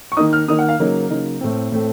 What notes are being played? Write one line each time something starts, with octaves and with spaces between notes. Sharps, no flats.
C#6
D#3 A#3 D#4 D#6
F6
D#3 A#3 D#4 D#6
F#5
F5
C#3 F#3 A#3 D#4
C#3 F#3 A#3 D#4
A2 A3 C4
A2 A3 C4